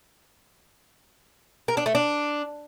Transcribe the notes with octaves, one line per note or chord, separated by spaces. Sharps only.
A#4
D4
A3
D4